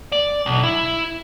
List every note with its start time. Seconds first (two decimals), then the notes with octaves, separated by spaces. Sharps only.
0.12 D5
0.46 B1
0.63 E4